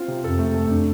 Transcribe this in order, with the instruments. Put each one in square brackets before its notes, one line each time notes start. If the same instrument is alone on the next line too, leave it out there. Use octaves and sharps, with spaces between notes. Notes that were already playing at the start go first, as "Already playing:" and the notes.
Already playing: [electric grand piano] C4 F4
C3
[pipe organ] F2 [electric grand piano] A4
[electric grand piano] A3
A3
D4